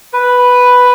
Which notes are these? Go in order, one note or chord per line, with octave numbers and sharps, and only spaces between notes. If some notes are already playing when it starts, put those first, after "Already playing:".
B4